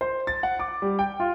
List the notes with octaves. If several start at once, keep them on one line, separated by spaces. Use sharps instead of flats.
C5
A6
F#5
D6
G3
G5
F4